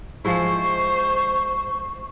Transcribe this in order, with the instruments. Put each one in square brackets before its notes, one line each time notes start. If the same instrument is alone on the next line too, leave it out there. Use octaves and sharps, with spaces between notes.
[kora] F3 G#3 E4 [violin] C5 [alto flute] C#6